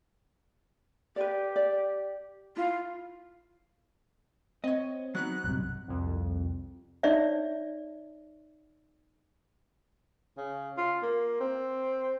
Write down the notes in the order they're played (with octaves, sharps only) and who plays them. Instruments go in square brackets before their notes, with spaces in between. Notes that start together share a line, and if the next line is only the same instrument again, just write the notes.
[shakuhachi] G4 [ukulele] B4 D5
[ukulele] D5
[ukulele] E4 [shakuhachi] F4
[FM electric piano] C4 [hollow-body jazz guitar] C#5 D#5
[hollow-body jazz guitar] F#3 B3 D#4 [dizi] F#6
[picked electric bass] B1 G2 C3
[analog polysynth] C2 F2
[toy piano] D#4 C#5 D5 E5
[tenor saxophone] C#3
F4
A#3
C4